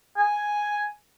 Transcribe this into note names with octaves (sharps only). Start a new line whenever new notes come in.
G#5